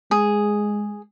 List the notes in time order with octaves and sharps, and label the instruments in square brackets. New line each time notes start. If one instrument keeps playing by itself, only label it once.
[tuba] G#3 [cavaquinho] G#4